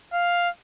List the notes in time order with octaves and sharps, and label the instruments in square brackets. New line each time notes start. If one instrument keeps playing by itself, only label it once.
[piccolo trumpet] F5